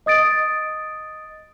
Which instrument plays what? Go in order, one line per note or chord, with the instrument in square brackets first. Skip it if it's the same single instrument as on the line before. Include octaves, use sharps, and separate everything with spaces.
[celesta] D#5 D#6 A6 D7